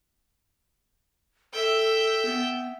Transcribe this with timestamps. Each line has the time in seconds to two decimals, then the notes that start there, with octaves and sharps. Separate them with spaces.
1.54 A4 E5 G5
2.25 B3